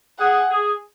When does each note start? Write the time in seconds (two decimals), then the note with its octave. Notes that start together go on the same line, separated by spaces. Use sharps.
0.19 G#4 F#5
0.50 G#4